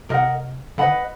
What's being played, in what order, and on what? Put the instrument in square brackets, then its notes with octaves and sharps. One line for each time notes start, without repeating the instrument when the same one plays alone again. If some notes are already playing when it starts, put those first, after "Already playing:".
[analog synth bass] C3 [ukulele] A#4 D#5 F#5
[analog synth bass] D3 [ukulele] B4 D#5 F#5 B5